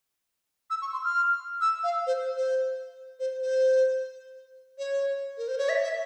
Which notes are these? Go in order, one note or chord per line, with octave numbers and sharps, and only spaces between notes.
E6
C#6
C6
F6
E6
F5
C5
C5
C5
C5
C#5
A#4
C5
C#5
E5
E5